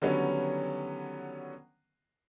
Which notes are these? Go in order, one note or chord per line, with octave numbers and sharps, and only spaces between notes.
D3 D#3 F#3 G3 B3 C#4